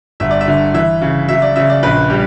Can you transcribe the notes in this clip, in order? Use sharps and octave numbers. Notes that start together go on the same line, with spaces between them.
G1 E5
D5
E5
D3
E3 E5
C#3
F#3 E5
D5
C#3 E5
D5
A#1 B4
G3 G4